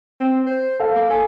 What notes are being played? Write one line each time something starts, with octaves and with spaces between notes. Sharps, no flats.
C4
C5
A4 F5
A#3
A4 G#5